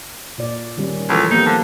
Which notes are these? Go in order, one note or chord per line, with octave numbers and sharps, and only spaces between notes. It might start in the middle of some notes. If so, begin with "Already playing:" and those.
A#2 D5
D#3 G3 C#4
C#2 E3 F3 A4
A#3 B3 D#4 G4
D3 F3 F#3